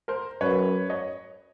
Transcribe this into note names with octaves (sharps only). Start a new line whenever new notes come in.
A#4 C5
F#2 B4 C#5
C#5 D#5